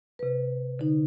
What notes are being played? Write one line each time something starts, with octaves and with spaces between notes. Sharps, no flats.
C3 B4
D3 D#4